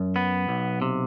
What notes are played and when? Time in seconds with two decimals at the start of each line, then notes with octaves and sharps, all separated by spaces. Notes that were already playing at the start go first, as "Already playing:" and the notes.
Already playing: F#2
0.16 B3
0.49 B1
0.82 C3